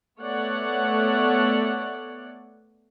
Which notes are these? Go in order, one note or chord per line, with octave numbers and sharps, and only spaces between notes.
A3 B3 C#5 D5 F#5